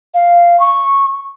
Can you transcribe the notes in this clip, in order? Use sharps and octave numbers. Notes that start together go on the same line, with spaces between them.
F5
C#6